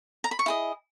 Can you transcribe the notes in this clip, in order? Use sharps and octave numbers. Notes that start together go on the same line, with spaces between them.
A#5
B5
C#6
E4 G#4 D#5